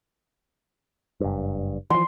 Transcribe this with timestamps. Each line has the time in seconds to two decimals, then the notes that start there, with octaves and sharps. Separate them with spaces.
1.20 F#1 G2
1.90 E3 F3 C6